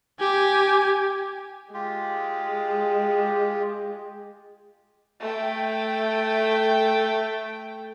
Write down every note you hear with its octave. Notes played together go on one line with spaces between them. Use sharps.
G4 G#5
G#3 F4 G4
A3 G5